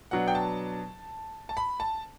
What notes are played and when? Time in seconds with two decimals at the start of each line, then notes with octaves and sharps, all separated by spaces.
0.11 B2 F#3 B3 D4 F#5
0.28 G5
0.35 A5
1.49 A5
1.57 B5
1.80 A5